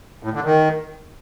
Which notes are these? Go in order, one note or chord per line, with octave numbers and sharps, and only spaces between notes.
A2
D3
D#3